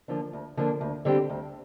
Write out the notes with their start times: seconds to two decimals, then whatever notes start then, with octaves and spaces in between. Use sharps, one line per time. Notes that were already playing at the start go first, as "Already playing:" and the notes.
0.08 D3 F3 A#3 D4
0.33 D2
0.57 D3 F3 A#3 D4
0.81 D2
1.05 D3 G3 C4 G4
1.29 D2